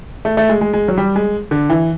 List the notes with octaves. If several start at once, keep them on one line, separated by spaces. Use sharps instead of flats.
A3
A3
G#3
G#3
G#3
F#3
G3
G#3
D3
E3